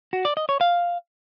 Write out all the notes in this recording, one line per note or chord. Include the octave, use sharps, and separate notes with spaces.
F#4
D5
D#5
C#5
F5